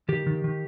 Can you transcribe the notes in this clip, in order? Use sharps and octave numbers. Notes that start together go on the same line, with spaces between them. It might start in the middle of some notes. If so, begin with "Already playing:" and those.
D#3 G4
D#3
D#3